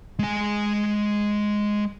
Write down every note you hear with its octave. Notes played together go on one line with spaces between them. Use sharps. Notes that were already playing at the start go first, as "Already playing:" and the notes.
G#3 G#5